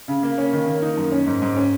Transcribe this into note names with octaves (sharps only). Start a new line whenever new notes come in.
C#3
A#3
C#4
D#3
A#3
D#4
F#2
C#4
G#2
G#2
C#4